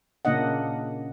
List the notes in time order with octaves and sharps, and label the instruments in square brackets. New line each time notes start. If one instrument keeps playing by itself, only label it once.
[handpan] A#2 C#3 A#3 D4 D#5 F#5